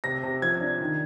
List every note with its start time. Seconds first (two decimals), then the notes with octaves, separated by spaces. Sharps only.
0.04 C3 A#6
0.23 C3
0.42 F3 G#6
0.61 D4
0.80 D#3